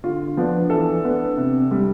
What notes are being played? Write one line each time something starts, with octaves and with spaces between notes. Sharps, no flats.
D3 F4
F3 B3 D4
E3 A4
B3 D4
C3
G3 D4